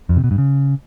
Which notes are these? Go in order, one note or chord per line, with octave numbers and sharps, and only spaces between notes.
F2
C3
B2
G2
C#3